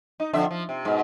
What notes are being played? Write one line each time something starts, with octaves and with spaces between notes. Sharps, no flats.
D#4
F2 D3 E5
F3
C3
G#2 B2